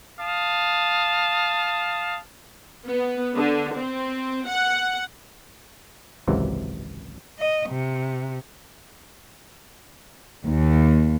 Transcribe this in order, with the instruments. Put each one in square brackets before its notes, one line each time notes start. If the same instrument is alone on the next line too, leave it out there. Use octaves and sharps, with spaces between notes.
[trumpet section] F5 A5 D#6
[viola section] B3
D3
C4
F#5
[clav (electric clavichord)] G#1 C#2 F#2 C3 E3
[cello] D#5
C3
[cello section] D#2